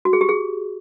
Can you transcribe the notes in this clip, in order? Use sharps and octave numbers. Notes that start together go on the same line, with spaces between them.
F#4
G#4
G4
G#4